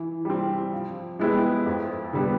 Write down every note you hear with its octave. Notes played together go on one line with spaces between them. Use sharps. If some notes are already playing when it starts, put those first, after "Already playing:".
Already playing: E3
G3 C4
F3
G#3 B3 E4 G4
F2
D3 G3 B3